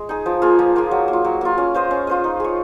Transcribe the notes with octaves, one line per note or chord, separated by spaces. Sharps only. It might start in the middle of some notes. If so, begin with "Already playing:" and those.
Already playing: G#3
D#4 G#4
F3
A#3 F4 G#4
F3
A#3 F4 G#4
F#3
A#3
F4
F#3
A#3 F4
C#4
F4 C5 D#5
C#4
F4 C5 D#5
D#4
G#4 C#5